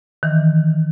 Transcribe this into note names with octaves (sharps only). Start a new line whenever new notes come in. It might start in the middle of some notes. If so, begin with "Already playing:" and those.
D#3 E3